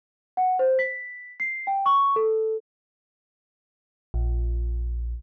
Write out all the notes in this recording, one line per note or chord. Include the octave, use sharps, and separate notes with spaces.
F#5
C5
B6
C7
G5
C#6
A4
A#1